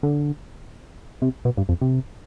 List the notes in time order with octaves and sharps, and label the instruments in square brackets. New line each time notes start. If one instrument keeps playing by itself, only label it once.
[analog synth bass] D3
C3
B2
G2
F2
C3